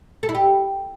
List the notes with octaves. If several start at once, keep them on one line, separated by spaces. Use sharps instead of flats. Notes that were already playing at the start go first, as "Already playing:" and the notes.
A4
E4
G4